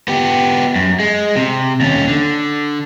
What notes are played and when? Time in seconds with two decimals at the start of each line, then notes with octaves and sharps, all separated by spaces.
0.08 B3 G4
0.76 F#2
1.00 G#3
1.36 C3
1.81 D#2 C#4
2.08 D3